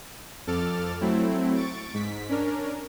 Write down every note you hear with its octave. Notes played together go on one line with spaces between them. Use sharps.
F2 A4 D6 F6 A6
F#3 A3 C4 E4
C#6 A6 D7
G#2 B6
C#4 D4 A#4